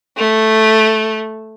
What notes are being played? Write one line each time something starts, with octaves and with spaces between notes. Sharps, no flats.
A3